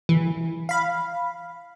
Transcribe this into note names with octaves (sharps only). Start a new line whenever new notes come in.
E3
F5 B5